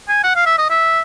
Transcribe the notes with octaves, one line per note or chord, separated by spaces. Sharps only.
G#5
F#5
F5
E5
D#5
E5